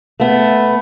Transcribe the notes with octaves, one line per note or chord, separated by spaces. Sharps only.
A3 B3